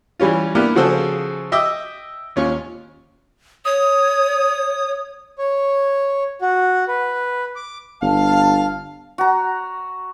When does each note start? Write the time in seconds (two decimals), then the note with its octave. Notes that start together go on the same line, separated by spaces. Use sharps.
0.20 E3 G3 C#4 F4
0.55 A#3 B3 D4 E4 G4 A#4
0.75 C#3 F3 F#4 G#4 A4 C5
1.52 D#5 E5 G5 D6 E6
2.36 D#2 C#4 F4 C#6
3.65 C#5 D#6
5.38 C#5
6.42 F#4
6.88 B4
7.56 D6
8.02 G1 F5 A5
9.18 F#4 A#5